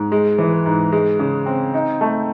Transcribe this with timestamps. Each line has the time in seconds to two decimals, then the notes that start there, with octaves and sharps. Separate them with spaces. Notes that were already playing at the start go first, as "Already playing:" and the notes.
Already playing: G#2
0.12 G#3
0.39 E3
0.66 G#2
0.92 G#3
1.19 C#3
1.46 C4
1.74 D#4
2.01 A3